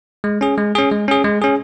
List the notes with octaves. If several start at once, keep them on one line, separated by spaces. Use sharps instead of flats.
G#3
C#4 G#4
G#3
C#4 G#4
G#3
C#4 G#4
G#3
C#4 G#4